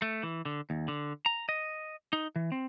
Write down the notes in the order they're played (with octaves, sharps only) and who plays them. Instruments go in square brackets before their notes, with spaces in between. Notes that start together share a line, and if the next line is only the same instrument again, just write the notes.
[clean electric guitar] A3
E3
D3
D#2
D3
A#5
D#5
D#4
E3
C4